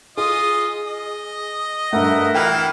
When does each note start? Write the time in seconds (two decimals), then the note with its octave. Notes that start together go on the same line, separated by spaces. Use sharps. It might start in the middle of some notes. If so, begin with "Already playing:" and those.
0.17 F4 G#4 D#5 D#6
0.87 D#5
1.93 G2 A3 A#4 E5 F#5
2.35 E3 E4 F5 G5 F6